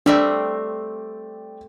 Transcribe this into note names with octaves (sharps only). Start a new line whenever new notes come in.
G3 A3 C4 D4 D5 G5